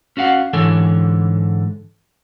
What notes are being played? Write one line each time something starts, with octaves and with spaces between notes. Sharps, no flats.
C#4 F#4 F5 F#5
G#2 D3 E3 A4 C#5 G#5